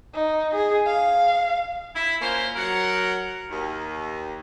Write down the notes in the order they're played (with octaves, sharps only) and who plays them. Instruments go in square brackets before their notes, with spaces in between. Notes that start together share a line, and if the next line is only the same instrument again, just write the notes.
[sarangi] D#4
G#4
F5
[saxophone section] E4
A#3 C#4 F4 C5
F#3 A#4 F#5
D#2